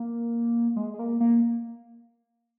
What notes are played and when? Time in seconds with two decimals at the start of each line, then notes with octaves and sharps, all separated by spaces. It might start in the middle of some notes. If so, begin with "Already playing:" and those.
Already playing: A#3
0.76 G#3
0.94 G#3
0.99 A#3
1.20 A#3